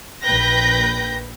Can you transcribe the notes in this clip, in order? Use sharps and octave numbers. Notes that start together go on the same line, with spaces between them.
A#1 B4 G5 G6 A#6